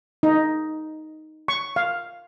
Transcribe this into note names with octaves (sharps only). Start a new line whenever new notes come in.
D#4
C#6
F5